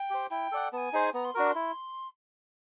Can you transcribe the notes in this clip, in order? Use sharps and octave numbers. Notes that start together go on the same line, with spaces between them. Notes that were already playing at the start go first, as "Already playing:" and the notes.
Already playing: G5
G4 C5
E4 G5
A4 D5 F#5
B3 A5
G#5
D#4 G#4 C5
B3 A#5
C6
D4 F#4 A#4
D6
C6
E4